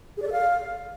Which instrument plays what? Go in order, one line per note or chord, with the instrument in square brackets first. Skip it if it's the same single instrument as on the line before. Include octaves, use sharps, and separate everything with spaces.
[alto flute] G#4
D5
A4
F5